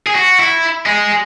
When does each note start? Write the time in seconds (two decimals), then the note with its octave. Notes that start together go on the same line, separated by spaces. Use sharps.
0.07 G#4
0.15 F#4
0.40 E4
0.86 G#3